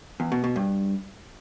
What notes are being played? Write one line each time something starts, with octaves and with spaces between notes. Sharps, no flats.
E2
B2
B2
G2